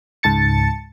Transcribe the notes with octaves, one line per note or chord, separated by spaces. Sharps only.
C#2 G#2 A5 A6 C#7